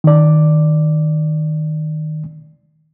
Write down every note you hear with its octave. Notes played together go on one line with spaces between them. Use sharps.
D#3 D5